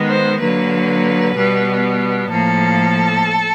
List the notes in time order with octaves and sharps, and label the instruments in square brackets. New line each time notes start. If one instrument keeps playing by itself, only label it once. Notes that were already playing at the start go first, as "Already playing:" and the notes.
Already playing: [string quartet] D#3 G#3 B3
C5
D3 F#3 A#3 B4
B2 G3 B3
A2 F3 A#3 A4